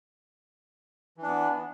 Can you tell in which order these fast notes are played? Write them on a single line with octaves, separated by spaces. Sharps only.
E3 D4 B3